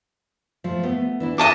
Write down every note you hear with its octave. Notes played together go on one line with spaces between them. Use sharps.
F3 A3
A3 B3
E3 D4 E4
F4 D#5 E5 A5 D6